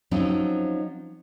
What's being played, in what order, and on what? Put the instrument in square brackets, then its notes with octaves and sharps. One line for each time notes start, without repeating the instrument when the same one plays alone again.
[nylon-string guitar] F3 F#3 C4 C#4 D#4